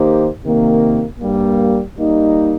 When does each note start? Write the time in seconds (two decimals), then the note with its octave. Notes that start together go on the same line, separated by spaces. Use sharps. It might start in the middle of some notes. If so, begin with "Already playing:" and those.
Already playing: D#3 A#3 D#4 G4 C5
0.44 C3 D#3 A#3
1.20 G2 G3 A#3
1.97 G3 A#3 D#4